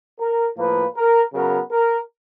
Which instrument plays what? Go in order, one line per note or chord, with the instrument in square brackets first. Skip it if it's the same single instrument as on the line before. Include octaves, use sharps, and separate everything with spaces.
[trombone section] A#4
A2 F3 A#3 B4
A#4
C#3 F#3 B3 A#4
A#4